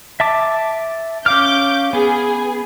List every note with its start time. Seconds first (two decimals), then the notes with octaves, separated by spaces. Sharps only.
0.20 E5 A5 D6
1.26 C#4 F5 D6 F6 G6
1.93 B3 G#4